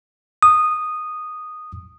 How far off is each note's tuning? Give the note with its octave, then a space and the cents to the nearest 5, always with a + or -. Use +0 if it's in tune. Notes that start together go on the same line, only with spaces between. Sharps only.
D#6 -10